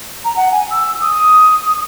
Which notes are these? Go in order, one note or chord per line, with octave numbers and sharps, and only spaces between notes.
A#5
F#5
G#5
E6
D#6